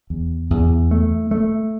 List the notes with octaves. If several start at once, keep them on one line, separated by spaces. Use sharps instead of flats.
E2
E2
A3
A3